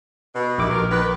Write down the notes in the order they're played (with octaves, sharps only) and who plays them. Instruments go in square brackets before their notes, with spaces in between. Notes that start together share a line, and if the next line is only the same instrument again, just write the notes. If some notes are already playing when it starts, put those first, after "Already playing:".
[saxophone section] B2
[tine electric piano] A#1 D6 [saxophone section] G2 D#3 E4
[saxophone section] A#4
D#3 B4